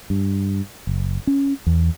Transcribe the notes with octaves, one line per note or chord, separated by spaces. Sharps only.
G2
F#1
C#4
E2